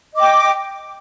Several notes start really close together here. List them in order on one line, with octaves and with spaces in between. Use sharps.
D#5 D6 G5